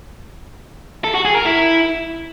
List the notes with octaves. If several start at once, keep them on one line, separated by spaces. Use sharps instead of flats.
A4
F#4
G#4
A#4
E4